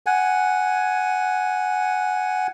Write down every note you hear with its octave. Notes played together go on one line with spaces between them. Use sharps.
F#5 G#5